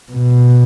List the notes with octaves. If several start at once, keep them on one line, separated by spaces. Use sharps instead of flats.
B2